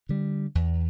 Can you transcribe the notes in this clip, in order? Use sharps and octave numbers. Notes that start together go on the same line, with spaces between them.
D3 G3
E2